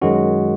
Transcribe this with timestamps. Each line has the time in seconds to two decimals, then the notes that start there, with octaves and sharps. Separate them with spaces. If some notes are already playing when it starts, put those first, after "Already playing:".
0.02 F#2 D#3 G#3 C#4 F#4